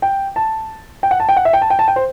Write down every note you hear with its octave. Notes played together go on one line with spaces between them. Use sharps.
G5
A5
G5
F#5
A5
G5
F#5
E5
G5
A5
G5
A5
G5
C5